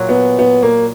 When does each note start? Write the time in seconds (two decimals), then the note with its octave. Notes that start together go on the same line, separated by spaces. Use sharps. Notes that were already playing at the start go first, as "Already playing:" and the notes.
Already playing: A#2 F#3
0.09 B3
0.39 B3
0.63 A#3